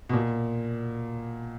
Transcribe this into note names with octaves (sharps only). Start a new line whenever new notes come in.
B2
A#2